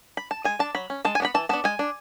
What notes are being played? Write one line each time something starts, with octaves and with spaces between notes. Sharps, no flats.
B5
A5
G#3 G#5
D4 A5
F#3 B5
C#4
G#3 A5
G#5
B3 D4 B5
E3 A5
B3 D4 A5
G#3 G#5
D4